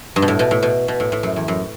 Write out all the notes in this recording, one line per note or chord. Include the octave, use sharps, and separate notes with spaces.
G2
B2
A2
B2
A2
B2
B2
A2
A2
F#2
E2
F#2